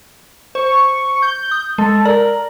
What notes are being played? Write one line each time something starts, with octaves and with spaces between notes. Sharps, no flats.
C5 C#6
G6
D#6
G#3 A4
A#4 D5